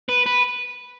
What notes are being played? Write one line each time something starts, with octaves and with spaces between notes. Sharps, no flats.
B4
B4